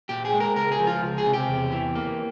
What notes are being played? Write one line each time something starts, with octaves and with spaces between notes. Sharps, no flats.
A#2 G4
G#4
G#3
A#4
C#2 A#4
G#4
F3
F4
C#2
G#4
C3
G4
E2
E3
A#3